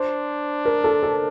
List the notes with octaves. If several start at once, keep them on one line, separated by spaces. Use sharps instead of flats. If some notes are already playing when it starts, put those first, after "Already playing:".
Already playing: D4 C5
A#4
A4
A4